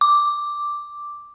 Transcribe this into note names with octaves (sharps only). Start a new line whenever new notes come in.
D6